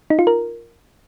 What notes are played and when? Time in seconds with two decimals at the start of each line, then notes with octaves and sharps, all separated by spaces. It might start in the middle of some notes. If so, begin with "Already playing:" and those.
0.10 D#4
0.19 F4
0.27 A#4